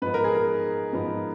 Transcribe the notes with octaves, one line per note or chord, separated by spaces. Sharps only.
G#2 F3 B3 B4
A#4
G#4
A#4
G#2 F3 B3